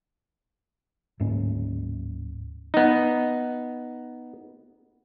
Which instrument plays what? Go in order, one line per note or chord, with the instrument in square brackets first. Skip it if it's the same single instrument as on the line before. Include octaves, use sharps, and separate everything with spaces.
[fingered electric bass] D1 G#2 A#3 C#4
[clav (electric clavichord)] B3 D#4